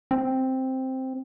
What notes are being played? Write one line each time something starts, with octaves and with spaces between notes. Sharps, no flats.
C4